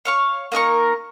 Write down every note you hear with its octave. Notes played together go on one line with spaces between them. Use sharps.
C#5 F5 C#6
A#3 D#4 A#4 C#6